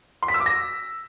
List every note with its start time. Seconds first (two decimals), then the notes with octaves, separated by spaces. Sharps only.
0.23 C6
0.28 B6
0.34 E6
0.40 D6
0.46 A#6